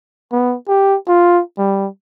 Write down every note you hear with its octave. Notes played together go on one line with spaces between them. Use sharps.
B3
G4
F4
G3